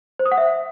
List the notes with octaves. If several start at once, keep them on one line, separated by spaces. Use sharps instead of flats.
C5
D#6
F#5
E5